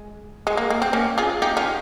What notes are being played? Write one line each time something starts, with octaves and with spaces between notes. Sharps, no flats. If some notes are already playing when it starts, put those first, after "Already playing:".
Already playing: G#3
G#3
A#3
A#3
C4
A#3 C#4
F4 G#4
D#4 G4
C#4 F4